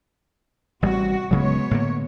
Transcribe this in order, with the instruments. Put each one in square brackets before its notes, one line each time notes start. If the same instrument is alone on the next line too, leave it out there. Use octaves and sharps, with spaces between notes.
[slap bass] A1 G3 [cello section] C3 F#4
[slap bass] D1 C#3 F#3 [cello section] G#3 B3 C#5
[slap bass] A2 D3 A#3